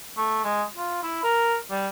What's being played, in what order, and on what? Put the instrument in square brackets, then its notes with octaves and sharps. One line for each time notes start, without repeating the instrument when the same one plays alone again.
[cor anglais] A3
G#3
F4
E4
A#4
G3